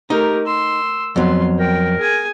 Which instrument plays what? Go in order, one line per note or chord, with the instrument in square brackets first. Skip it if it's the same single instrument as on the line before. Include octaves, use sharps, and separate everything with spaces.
[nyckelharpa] A3 A#4 [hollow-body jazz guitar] D#4 [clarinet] G4
[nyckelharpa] C6 [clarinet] E6
[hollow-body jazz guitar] F2 F#3 [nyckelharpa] B3 C6
[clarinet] A#4 [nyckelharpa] G5
[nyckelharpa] G#4 G#5